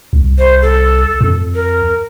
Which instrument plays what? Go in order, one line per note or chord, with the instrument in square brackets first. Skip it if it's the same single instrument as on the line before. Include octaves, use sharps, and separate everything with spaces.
[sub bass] C2
[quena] C5
A4
[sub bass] F2
[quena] A#4